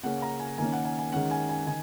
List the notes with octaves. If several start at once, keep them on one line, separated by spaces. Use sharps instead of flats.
C#3 A#3 C#4 F#5
A#5
G#5
D#3 A#3 C#4 G#5
F#5
G#5
G#5
D#3 G#3 C#4 F#5
G#5
G#5
D#3 G#5